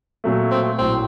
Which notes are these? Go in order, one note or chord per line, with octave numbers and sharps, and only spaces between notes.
A#2 F#3 A3
C4
A#1 A2 F#3 C4